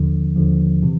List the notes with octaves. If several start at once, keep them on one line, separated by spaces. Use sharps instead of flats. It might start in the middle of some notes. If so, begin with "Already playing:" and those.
Already playing: D#2 D3 F3
D#2 D3 F3
C3 E3